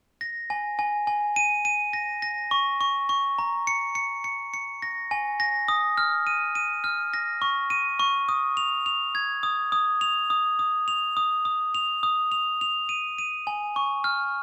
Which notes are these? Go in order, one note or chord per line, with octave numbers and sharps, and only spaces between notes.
A#6
G#5
G#5
G#5
D#7
D#7
A#6
A#6
C#6
C#6
C#6
A#5
C#7
C#7
C#7
C#7
A#6
G#5
A#6
D#6
F6
D#7
D#7
F6
A#6
C#6
D#7
C#6
D#6
F7
F7
G#6
D#6
D#6
F7
D#6
D#6
F7
D#6
D#6
F7
D#6
F7
F7
D#7
D#7
G#5
C#6
F6